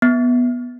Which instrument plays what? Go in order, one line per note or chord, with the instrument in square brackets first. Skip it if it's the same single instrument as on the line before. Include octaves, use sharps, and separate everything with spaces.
[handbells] B3